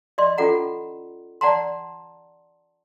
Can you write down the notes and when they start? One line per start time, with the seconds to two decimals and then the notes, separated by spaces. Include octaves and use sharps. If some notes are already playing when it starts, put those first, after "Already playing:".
0.18 D5 D#5 C6
0.38 C#4 F4 A4 F#5 A#5
1.41 D5 F#5 A5 A#5 C6